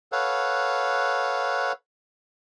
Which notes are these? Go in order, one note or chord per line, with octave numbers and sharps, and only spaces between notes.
A4 B4 C#5 F5 F#5